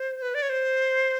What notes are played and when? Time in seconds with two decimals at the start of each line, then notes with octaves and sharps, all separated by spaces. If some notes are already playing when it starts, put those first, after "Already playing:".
Already playing: C5
0.22 B4
0.35 D5
0.42 C#5
0.50 C5